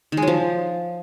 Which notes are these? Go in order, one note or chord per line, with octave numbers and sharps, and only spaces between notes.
D#3
G#3
F#3
F3